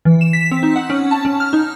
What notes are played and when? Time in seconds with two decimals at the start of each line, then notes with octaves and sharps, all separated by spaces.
0.05 E3
0.21 E7
0.33 B6
0.51 C4
0.63 D#4
0.76 F#5
0.90 C#4
1.11 A5
1.25 C#4
1.40 F6
1.53 D#4